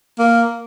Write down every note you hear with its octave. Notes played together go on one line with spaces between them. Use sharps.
A#3